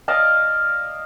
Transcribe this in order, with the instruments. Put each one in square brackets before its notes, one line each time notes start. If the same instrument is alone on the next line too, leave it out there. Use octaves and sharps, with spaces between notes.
[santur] D5 D#5 F5 A5